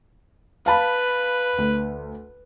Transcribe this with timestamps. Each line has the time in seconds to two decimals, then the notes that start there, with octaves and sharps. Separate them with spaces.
0.66 B4 F5 A5 B5
1.58 D2